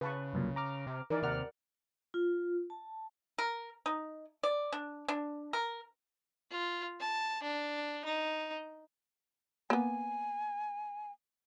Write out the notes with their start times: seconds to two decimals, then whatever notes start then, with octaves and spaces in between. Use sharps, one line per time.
0.01 C#3 B4 A5 C#6
0.33 C2 F#2 A#2
0.56 A#5 D6 F6
0.87 C3
1.10 D#3 E3 A#4 D5
1.23 D#2 C3 A#4 D5 F#5 F6
2.14 F4
2.70 A5
3.38 A#4
3.86 D#4
4.43 D5
4.72 D4
5.08 D4
5.53 A#4
6.51 F4
7.00 A5
7.43 D4
8.05 D#4
9.70 A#3 B3 G#5